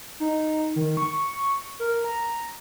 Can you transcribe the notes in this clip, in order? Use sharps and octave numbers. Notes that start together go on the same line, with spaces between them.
D#4
D#3
C#6
A#4
A#5